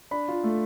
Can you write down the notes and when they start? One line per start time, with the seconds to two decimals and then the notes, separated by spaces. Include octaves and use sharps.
0.11 D4 B5
0.28 F4
0.44 A3